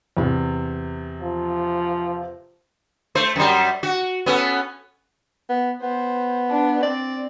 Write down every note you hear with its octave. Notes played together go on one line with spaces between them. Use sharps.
E2 C3
F3
A3 C5
F#2 G3
F#4
B3 C#4 A4
B3
B3 C5
D4
C4 D5